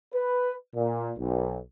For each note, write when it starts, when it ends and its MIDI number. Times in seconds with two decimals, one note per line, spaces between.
0.14 0.53 71
0.75 1.13 46
1.18 1.58 35